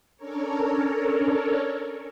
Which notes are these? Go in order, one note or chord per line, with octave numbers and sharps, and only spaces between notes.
C#4 D4 A4 A#4 C#5